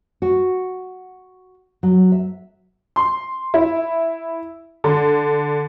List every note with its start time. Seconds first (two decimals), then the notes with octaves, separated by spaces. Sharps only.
0.22 F#4
1.83 F#3
2.12 E5
2.96 C6
3.54 E4
4.84 D3